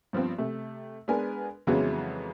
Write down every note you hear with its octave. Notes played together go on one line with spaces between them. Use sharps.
G2 F3 B3 C4
C3 A3
G#3 B3 D4 A#4 B4 G#5
F2 C#3 E3 F#3 G#3 B3